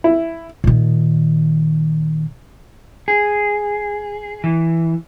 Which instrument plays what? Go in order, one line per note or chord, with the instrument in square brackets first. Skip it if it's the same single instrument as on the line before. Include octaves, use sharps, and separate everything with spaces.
[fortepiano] E4
[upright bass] A#2 D#3
[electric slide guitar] G#4
E3